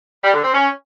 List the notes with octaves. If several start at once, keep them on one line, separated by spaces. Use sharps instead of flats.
G3
D3
C4
C#4